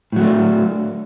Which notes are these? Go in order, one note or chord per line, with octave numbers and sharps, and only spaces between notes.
A2 F#3 A3 D4